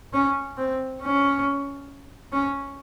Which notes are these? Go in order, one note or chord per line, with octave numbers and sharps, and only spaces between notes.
C#4
C4
C#4
C#4